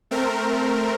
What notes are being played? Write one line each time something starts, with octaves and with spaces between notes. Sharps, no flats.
A3 C4 A#4